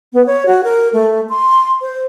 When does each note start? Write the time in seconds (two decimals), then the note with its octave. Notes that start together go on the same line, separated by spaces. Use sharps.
0.13 B3
0.26 C#5
0.46 F#4
0.64 A#4
0.93 A3
1.29 C6
1.82 C5